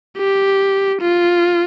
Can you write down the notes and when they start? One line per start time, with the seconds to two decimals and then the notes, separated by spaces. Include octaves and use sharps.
0.18 G4
1.01 F4